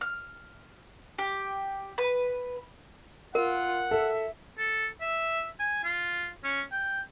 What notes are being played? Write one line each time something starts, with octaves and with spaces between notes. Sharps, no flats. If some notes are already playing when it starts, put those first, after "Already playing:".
F6
G4
B4
F4 A#4 F#5
A4 E5
A4
E5
G#5
F4
C#4
G5